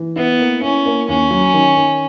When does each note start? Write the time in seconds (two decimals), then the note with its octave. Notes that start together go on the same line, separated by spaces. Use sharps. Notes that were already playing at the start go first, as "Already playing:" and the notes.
Already playing: E3
0.16 B3 E4
0.39 A#3
0.62 C#4 E4
0.86 A#3
1.08 D#2 C#4
1.31 F#3
1.54 D#3
1.77 D#3